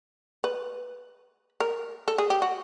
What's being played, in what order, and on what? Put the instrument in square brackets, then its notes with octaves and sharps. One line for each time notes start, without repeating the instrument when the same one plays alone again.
[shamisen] B4
A#4
A4
G#4
G4
F#4